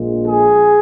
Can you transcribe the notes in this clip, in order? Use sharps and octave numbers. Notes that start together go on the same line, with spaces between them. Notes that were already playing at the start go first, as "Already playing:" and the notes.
Already playing: A#1 A#2 G#3
G#4